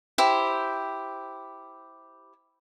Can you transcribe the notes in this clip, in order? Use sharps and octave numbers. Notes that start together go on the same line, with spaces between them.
E4 G4 C5